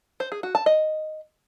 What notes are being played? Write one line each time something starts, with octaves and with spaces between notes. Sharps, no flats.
C5
G#4
F#4
A5
D#5